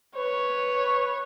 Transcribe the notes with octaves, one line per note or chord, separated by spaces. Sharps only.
B4 C#5